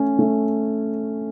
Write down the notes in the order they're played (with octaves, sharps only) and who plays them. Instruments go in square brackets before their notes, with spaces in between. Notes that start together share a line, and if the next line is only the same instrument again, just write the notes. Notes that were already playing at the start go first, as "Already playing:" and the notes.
Already playing: [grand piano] A3 C#4
A3